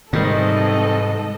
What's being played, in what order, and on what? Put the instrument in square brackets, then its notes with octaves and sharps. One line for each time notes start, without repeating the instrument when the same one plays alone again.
[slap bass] G#2 [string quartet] C3 E3 C4 [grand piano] D#3 G3 [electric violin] A4 D#5